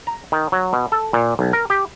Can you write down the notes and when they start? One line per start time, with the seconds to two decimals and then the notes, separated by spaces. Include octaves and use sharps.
0.07 A#5
0.32 D#3
0.52 F#3
0.73 B2
0.92 A4
1.13 A#2
1.39 B1
1.53 A#4
1.70 G4